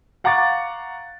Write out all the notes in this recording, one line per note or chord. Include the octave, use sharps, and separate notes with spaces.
F5 F#5 A#5 C#6 D6 A6